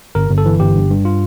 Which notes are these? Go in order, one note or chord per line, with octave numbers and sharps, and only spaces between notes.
G1 A#4
G1
A4
E3
G1 G4
G2
G2
F4